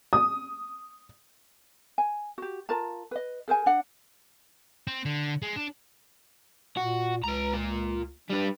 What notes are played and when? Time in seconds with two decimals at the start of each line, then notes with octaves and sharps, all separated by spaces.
0.13 D#6
1.98 G#5
2.38 F#4 G4
2.69 F4 A#4 A5 A#5
3.11 B4 D#5
3.48 G#4 A#4 C5 G#5
3.66 D4 F#5
4.87 C4
5.05 D3
5.42 G#3
5.56 D4
6.77 A#2 F#4
7.24 C#2 B4 A#5
7.53 A#3 F4
8.30 G3 D4 B4